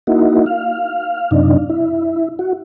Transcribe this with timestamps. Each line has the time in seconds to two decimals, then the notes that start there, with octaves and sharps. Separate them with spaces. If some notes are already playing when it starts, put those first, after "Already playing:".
0.07 A#3 D#4 E4 F#4
0.46 F5
1.31 F#2 C3 D4 D#4
1.70 E4
2.39 F#4